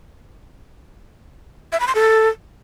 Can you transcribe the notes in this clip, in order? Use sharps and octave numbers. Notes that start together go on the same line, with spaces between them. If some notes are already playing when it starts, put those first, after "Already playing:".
E5
B5
C6
A4